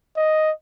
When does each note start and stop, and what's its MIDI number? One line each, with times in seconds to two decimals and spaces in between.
0.17 0.51 75